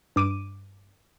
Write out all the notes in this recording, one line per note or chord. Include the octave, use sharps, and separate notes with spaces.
G2 D6 D7 D#7